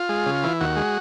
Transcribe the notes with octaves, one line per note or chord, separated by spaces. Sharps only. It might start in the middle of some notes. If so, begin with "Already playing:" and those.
Already playing: F4
G#3
C#3
E3
D#2 F#4
G#3